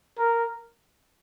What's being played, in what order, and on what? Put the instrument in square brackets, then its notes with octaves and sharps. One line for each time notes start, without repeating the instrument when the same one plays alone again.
[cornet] A#4